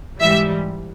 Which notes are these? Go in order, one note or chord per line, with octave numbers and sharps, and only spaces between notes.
G#2 E3 G3 E5